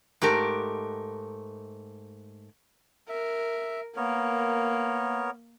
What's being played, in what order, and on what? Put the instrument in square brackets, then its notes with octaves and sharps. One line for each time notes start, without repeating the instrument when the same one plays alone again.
[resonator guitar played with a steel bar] G#2 A3 G4 A#4
[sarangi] A#4 [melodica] E5
[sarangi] A#3 [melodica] B3 A#4 C#5